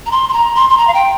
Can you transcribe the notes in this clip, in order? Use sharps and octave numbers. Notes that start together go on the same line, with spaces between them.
A#5
C6
C6
A#5
C6
C6
A#5
F5
G5